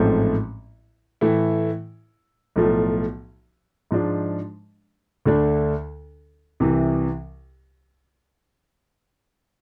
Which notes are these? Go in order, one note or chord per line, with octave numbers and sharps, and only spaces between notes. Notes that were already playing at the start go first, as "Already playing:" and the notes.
Already playing: A1 G#2 F3 A3 C4
A2 E3 A3 E4
B1 A2 F3 A3
G#2 F3 G#3 D4
D2 D3 A3 D4
C2 C3 E3